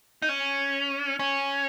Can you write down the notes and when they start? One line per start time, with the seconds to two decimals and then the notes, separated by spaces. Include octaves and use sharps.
0.22 D#4
0.29 C#4
1.19 C#4